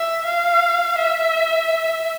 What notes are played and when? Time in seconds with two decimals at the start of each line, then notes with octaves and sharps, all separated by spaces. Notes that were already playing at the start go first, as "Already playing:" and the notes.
Already playing: E5
0.26 F5
0.98 E5